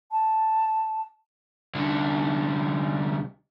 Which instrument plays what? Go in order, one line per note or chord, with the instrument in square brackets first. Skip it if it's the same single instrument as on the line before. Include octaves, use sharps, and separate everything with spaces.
[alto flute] A5
[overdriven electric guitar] C2 D3